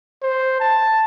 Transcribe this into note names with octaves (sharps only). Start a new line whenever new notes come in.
C5
A5